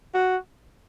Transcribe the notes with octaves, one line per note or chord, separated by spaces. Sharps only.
F#4